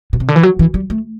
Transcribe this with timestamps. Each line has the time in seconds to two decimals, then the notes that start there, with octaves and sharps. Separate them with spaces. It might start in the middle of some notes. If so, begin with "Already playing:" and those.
0.13 B2
0.20 C3
0.28 D3
0.36 E3
0.43 F#3
0.59 E3
0.74 G3
0.90 A3